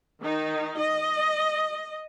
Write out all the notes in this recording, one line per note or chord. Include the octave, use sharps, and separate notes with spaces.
D#3 D#4
D#5